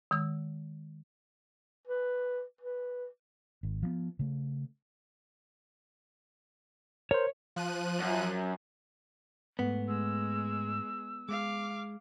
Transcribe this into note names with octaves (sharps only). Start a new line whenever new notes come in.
D#3 G#3 E6
B4
B4
G#1
F3 G3 B3
C#3 A3
A#4 C5 C#5
F3 F#6 D#7
F#2
G#2 A3 B3
G#3 E6
G#3 F5 D6